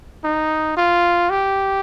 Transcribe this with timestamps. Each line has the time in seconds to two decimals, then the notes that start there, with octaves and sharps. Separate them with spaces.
0.24 D#4
0.77 F4
1.30 G4